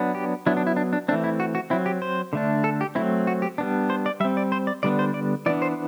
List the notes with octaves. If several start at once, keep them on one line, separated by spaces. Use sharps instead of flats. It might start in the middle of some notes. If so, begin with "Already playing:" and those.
Already playing: F#3 B3 D4
G4
F#3 B3 D4 E4
D4
E4
D4
D4
E3 A3 C4 D4
E4
F#4
F#4
F#3 C4 E4
G4
C5
D3 A3 D4
A4
G4
F#3 A3 C4 E4
F#4
G4
G3 B3 D4
C5
D5
G3 C4 E5
D5
C5
D5
D3 G3 B3 D4 D5
C5
D5
E3 B3 D4 D5
C5